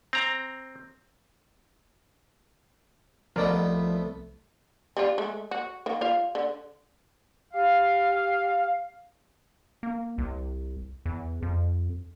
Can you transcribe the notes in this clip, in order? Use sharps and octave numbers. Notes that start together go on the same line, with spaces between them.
C4 A#5
C2 F3 A3 B3 A#4 D5 D#5
G3 D4 F4
G#3 A3
F#4
D#3 A#3
F4 F5
D3
G4 F5
A#3
C2
E2
F2